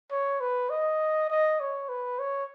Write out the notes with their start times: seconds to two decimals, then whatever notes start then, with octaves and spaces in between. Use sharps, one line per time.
0.11 C#5
0.40 B4
0.70 D#5
1.30 D#5
1.60 C#5
1.89 B4
2.19 C#5